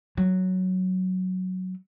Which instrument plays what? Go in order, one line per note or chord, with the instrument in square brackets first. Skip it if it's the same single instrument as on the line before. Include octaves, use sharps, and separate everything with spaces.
[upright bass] F#3